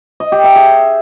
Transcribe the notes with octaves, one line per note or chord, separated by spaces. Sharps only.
D#5
G4
E5
G#4